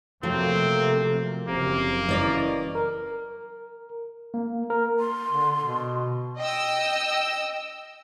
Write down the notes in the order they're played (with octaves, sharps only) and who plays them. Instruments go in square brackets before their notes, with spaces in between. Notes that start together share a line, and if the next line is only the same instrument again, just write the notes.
[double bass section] C3 A#3 [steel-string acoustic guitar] F3 F#3 [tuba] A3 [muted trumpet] C4
[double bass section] F#1 [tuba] C3 [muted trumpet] A#3
[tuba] E3 [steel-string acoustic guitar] C#4 D5 D#5
[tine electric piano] A#4
A#3
A#4
[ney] C6
[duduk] D3
B2
[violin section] D#5 G5 E6